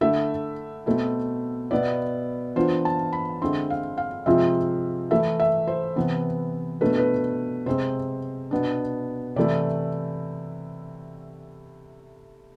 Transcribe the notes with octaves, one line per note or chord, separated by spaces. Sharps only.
D3 A3 E4 E5
B2 A3 C4 E4
B2 B3 E4 D5
E3 B3 D4 F4 C5
A5
B5
D3 G#3 C4 E4 C6
F5
F5
C3 F3 G#3 C4 F4 E5
E3 A3 E4 E5
E5
C5
C3 E3 B3
B2 A3 D4 B4
B4
C3 G#3 C4 C5
B2 B3 D4
C3 E3 A3 E4 D5